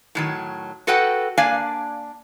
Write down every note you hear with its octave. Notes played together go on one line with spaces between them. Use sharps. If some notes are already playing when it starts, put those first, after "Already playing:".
A2 D#3 F#3
F#4 A4 B4 D#5 F#5 G5
A#3 D4 D5 F5 G#5